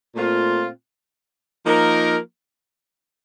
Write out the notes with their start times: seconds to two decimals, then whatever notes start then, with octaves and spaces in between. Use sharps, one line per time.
0.15 A#2 A3 C4 F4
1.65 F3 A#3 D#4 A#4